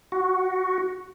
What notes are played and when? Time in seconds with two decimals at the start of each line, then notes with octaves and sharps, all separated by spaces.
0.12 F#4